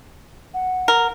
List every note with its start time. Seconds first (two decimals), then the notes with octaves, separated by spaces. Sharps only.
0.54 F#5
0.88 A#4